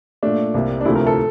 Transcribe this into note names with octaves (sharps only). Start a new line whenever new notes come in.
A#2 A3 D4
C2 C3 G3 A#3
D4
D2 C3 F3 A3 E4
A#4
A4